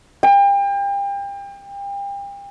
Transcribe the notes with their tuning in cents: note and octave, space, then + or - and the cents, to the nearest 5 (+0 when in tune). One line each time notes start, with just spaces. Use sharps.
G5 +35